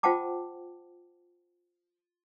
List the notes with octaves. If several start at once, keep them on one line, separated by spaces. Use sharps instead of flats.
F4 C5 F#5 G5 A5 D6